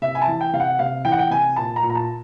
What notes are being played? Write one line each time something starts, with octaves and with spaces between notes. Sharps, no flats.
C3 E5
G#5
A5
E3
G5
C3 F5
F#5
C3 F5
E3 G5
F#5
G5
C3 G#5
A#2 A5
A#5
A#2
A#5
A5